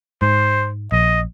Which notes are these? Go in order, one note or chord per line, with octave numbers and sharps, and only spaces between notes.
G#2 C5
A#1 D#5